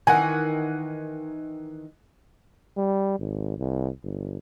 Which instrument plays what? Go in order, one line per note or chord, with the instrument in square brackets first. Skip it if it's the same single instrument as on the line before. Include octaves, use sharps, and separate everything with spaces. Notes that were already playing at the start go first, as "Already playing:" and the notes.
[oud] D#3 E3 [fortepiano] F#5 G#5
[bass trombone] G3
G#1
C2
G1